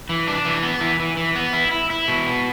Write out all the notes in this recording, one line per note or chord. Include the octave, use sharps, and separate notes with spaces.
E3
D4
E3
B3
E3
E3
E3
B3
E4
E4
E4
B2
B3